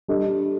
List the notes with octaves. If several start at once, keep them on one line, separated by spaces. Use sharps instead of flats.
G3 D4 A4 D#5